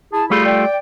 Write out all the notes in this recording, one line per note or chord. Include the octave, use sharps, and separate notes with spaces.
E4 G#4 A5
G3 A3 F4 G#4 B5
D5 G5